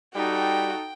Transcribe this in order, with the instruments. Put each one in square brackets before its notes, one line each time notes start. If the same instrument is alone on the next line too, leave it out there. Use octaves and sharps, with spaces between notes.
[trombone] G3 [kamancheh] D#4 A4 [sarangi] F#4 [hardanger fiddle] G5